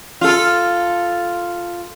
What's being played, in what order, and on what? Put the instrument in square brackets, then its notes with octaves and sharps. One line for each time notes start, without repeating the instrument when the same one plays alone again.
[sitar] F4 A4